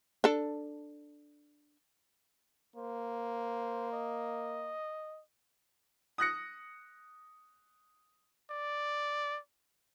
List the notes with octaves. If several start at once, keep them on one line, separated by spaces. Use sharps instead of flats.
D4 A4
A#3 C5
D#5
D#6 F#6 A#6 C#7
D5